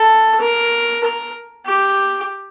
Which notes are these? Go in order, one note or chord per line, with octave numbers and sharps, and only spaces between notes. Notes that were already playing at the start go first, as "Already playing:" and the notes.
Already playing: A4
A#4
A#4
G4